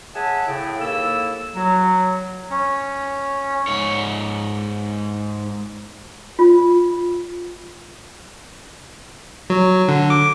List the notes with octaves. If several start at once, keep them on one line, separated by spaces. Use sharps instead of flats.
G#4 C#5 E5 F#5 G#5 A5
A2 C#3 G5
D#2 A#3 E4 A4 E6
F#3
C#4
G#2 C#5
F4
F#3
D3
D6